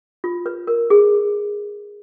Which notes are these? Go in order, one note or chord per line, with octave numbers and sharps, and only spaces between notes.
F4
B4
A#4
G#4